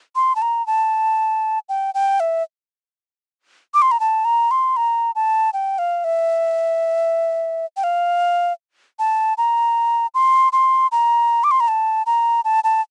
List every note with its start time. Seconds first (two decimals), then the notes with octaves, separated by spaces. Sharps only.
0.16 C6
0.36 A5
0.42 A#5
0.67 A5
1.69 G5
1.94 G5
2.20 E5
3.74 D6
3.82 C6
3.91 A#5
4.00 A5
4.25 A#5
4.51 C6
4.77 A#5
5.15 A5
5.53 G5
5.78 F5
6.04 E5
7.77 G5
7.84 F5
8.99 A5
9.38 A#5
10.14 C6
10.53 C6
10.92 A#5
11.44 D6
11.51 C6
11.60 A#5
11.68 A5
12.06 A#5
12.45 A5
12.64 A5